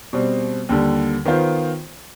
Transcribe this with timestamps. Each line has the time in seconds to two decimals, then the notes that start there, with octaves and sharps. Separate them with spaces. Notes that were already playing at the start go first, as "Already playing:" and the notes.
0.13 B2 G3 C4
0.69 D#2 D3 G3
1.25 D#3 B3 F4 C5